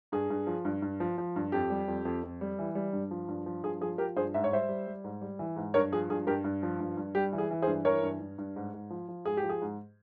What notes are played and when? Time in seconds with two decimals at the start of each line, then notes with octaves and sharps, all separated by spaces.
0.12 G2 G#4
0.30 G2
0.47 F3
0.65 G2
0.82 G2
1.00 F3
1.18 F3
1.36 G2
1.52 F2 G4
1.70 G3
1.88 F2
2.05 F2
2.23 F2
2.41 G3
2.59 E3
2.75 G3
2.93 G2
3.11 F3
3.28 G2
3.46 F3
3.64 G2 G#4
3.81 F3 G#4
3.98 F3 G4 A#4
4.16 G2 G#4 C5
4.34 G#2 E5
4.44 C#5
4.52 G3 C5 E5
4.69 G3
4.87 G3
5.04 G#2
5.21 G3
5.39 E3
5.56 G#2
5.74 G2 A#4 C#5
5.92 F3 G#4
6.10 G2 G#4
6.27 G2 G4 A#4
6.44 G2
6.63 F3
6.80 G2
6.97 G2
7.15 G3 G4
7.33 E3
7.38 G#4
7.51 E3
7.62 G#4 C5
7.67 G2
7.85 E3 A#4 C#5
8.03 G2
8.20 G2
8.38 G2
8.56 G#2
8.74 G#2
8.90 F3
9.08 F3
9.25 G#2 G#4
9.37 G4
9.43 F3
9.49 G#4
9.62 G#2